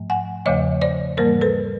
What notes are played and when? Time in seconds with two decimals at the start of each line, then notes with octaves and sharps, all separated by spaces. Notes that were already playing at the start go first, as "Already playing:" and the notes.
Already playing: G#2 F3 A3
0.10 F#5 G#5
0.46 E2 C#3 F3 A3 C#5 D#5
0.82 C5 D5
1.17 G#2 E3 G3 A#3 A#4 C5
1.41 A4 B4